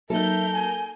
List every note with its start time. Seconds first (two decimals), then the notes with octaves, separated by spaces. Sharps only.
0.10 F#3 A#3 D#4 A4 A#4 E5 G6
0.52 G#5